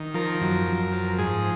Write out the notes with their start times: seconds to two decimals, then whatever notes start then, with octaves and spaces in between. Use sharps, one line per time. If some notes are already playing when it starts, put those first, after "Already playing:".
Already playing: D#3
0.14 F3 A#4
0.41 F#2
0.67 F#2
0.92 F3
1.18 G#2 G#4